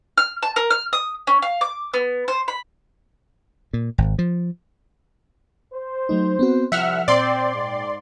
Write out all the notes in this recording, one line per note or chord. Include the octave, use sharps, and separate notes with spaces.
F6
A5
A#4
F6
D#6
C#4
F5
D6
B3
C5
B5
A#2
G#1
F3
C5
F#3 A3 D#4
B3 C4 F#4
C2 F3 E5 F#5 F6
A#2 C4 D5 G5 C6
G#2